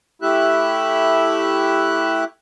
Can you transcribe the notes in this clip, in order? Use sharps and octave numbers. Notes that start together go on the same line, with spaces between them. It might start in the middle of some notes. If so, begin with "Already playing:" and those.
A3 E4 G4 E5 F#6